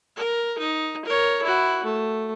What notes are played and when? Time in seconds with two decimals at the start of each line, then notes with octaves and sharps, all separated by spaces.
0.17 A#4
0.59 D#4
1.05 A#4 C#5
1.43 E4 F#4
1.84 A3